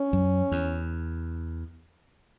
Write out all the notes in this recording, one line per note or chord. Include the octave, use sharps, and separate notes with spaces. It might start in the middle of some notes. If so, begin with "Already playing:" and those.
Already playing: C#4
F#2
E2